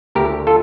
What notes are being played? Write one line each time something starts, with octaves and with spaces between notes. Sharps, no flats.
D2 D3 G4 A#4
F4 A4